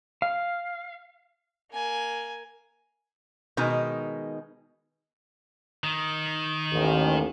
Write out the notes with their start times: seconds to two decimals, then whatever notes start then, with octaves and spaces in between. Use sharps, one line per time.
0.22 F5
1.72 A#3 G#5
3.57 B2 D#3 G#3 D#4
5.84 D#3
6.71 A1 D#2